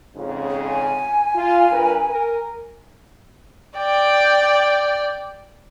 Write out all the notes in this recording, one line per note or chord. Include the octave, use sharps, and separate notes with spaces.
F2 G#2 C#3
G#5
F4
G2 A#4 B4
A#4
D5 G5